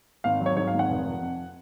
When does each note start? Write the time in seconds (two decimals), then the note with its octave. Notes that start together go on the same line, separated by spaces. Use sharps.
0.24 G#1 F5
0.40 F#3
0.46 C#5
0.57 G#2 C#5
0.68 F5
0.74 G#1
0.79 F#5
0.90 F1
1.06 F3
1.22 F2